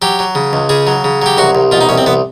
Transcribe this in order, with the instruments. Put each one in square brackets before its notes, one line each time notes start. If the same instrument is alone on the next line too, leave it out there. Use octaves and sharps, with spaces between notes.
[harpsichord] F#3 G4
F#3
C#3
C#2
C#3 G#4
F#3
C#3
F#3 G4
C2 F#4
C2
B2 F4
D#4
C2 C#4
C4
C2 B3